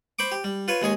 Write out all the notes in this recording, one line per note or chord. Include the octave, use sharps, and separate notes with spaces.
C5 B5 C#6 D6
G4
G3
F4 B4 C#5
D#2 G#3 G#4 C#6